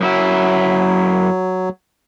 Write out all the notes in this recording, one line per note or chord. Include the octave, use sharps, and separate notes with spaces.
F#2 F#3 E4 E5